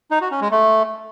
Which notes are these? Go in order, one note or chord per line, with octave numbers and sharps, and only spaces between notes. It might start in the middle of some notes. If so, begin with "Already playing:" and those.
D#4
F#4
C#4
G#3
A3